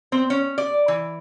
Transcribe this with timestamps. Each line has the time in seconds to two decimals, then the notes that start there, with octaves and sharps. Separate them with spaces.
0.12 C4
0.30 C#4
0.58 D5
0.88 E3